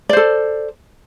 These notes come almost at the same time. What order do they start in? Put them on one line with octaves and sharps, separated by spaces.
D5 C5 A4